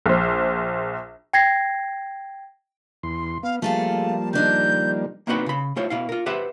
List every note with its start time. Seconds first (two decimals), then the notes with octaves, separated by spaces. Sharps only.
0.06 A#1 C5
1.33 G5 G#6 A#6 C7
3.03 E2 C6
3.43 B3 F5
3.62 F3 G3 A3 A#3 F4 G#4 A5
4.33 D#3 D4 D#4 G6
5.27 A#3 C4 D4 D#4 F#4 B4
5.46 C#3 B5
5.76 A3 E4 F4 C5 C#5
5.90 B2 E4 F5
6.09 F4 A#4
6.26 G4 B4 C5 E5 F#5